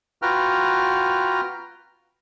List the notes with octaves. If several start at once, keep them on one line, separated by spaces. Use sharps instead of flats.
F4 F#4 B4 G5 A#5 F6